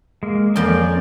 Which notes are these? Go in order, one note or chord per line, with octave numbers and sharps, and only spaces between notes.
G#3 A#3
F2 A#3 C#4 D5 G5 C6